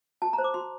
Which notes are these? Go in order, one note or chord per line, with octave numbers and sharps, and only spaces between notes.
F#4 A5
A#5
C5
D6
F#4 C6